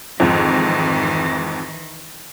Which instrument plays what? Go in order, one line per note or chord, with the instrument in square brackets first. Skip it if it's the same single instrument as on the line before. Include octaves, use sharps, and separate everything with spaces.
[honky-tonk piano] F2 G#2 [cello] D#3 E3